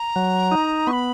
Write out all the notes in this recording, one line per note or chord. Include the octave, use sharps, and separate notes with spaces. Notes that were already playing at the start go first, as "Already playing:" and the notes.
Already playing: A#5
F#3
D#4
B3 C#6
B5